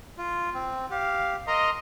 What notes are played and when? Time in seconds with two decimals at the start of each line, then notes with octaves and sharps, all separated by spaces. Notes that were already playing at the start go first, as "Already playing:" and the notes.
0.18 F4
0.54 C4
0.91 G4 F5
1.48 A#4 D#5 A#5 C6